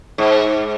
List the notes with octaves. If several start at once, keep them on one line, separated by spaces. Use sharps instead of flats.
G#2